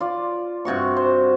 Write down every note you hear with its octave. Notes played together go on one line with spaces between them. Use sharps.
F4 D5
G2 C3 F#4 C#6
C5